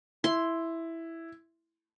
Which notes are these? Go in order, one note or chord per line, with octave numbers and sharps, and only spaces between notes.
E4 C6